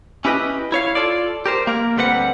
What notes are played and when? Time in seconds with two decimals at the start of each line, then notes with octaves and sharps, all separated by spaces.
0.25 C#4 E4 G4 B4 D#5
0.72 E4 C#5 F5
0.95 F4 A4 D5
1.46 G4 A#4 C5
1.67 A#3 A#4
1.97 D2 G3 C4 B4 D5 F#5